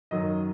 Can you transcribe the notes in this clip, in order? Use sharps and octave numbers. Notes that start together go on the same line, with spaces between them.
F#2 D#3 F#3 D#5